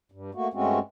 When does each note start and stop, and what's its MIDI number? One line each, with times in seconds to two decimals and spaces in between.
0.12 0.31 43
0.35 0.48 57
0.35 0.48 58
0.35 0.48 66
0.54 0.79 43
0.54 0.79 56
0.54 0.79 57
0.54 0.79 60
0.54 0.79 61
0.54 0.79 66